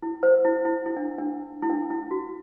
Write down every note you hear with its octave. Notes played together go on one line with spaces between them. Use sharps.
E4
C5
E4
E4
E4
D4
D4
E4
D4
E4
F#4